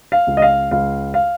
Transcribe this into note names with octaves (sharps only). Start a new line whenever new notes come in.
F5
C#2
D#5
F5
C#2 F5
F5